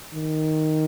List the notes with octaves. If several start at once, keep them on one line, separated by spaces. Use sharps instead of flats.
D#3